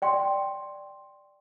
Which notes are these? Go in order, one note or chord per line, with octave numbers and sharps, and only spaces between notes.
D5 G5 C6 C#6